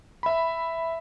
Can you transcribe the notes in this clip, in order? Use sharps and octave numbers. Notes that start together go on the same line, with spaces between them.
E5 B5